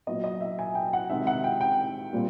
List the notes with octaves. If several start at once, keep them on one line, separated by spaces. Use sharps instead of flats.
A#2 F#3 B3 D#5
D#5
E5
G#5
G5
F#5
C3 D#3 G#3 C4 D#4 E5
F#5
G5
G5
A#2 G3 C4